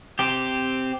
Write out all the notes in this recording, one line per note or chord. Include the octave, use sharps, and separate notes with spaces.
C4 G4